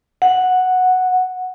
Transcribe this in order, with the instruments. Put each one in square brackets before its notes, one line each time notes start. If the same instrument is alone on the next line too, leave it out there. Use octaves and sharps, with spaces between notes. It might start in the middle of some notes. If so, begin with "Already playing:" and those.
[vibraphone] F#5